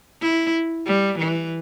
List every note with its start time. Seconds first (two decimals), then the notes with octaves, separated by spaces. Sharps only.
0.22 E4
0.87 G3
1.19 E3